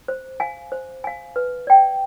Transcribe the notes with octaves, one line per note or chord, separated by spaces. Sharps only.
C5
F5 G#5
C5
F5 G#5
B4
D5 G5